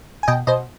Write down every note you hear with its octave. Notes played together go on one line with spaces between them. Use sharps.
G#5
B2 D#5 G5
B2 C5 D#5